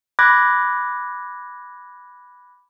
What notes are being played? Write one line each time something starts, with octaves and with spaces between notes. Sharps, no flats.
B5 D6 F#6 G#6 A#6